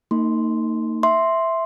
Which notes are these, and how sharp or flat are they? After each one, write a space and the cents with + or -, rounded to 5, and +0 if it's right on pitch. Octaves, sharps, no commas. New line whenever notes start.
A#3 -40 D#4 +0 C6 -5
E5 +0 C6 +0